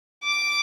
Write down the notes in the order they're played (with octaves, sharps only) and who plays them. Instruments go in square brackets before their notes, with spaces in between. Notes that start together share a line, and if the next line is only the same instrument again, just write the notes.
[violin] D6